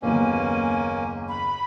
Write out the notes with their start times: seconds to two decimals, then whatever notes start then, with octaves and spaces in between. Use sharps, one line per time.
0.02 F#1 D#2 A#3 B3 C#4 G#5
1.28 B5